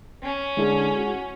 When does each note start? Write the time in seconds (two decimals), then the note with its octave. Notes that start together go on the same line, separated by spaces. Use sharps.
0.23 C#4
0.57 D3 G#3 E4 G#4
0.95 F#4